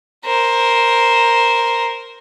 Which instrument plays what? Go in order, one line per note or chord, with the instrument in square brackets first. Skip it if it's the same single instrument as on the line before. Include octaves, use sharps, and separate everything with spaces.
[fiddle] A#4 C5